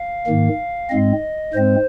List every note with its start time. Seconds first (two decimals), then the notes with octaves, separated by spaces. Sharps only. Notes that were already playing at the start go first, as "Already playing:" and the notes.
Already playing: F5
0.27 G#2 D#3 A#3
0.89 G#2 G#3 C4 D#5
1.54 G#2 G#3 C4 C5